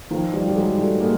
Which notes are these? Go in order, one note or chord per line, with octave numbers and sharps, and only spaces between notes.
D#3 F3
F3 G3
G3
F#3 G#3
G3 A3
G#3 A#3